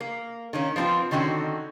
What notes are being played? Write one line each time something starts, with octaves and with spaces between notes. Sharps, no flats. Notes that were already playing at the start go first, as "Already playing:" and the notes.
A#3
D#3 A#3 C#4
F3 B3 C4 D#4 F4
D3 D#3 C4 C#4 F#4